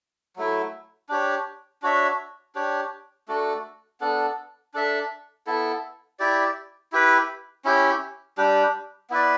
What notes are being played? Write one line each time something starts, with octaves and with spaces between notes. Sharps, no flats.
F#3 A3 E4
D4 G4 C#5
D4 F#4 C#5 E5
D4 G4 C#5
A3 D4 F#4 A4
B3 D4 A4
D4 A4 E5
B3 E4 A4
E4 G4 D5
E4 G4 B4
C#4 E4 G4
G3 D4 G4
B3 E4 B4 D5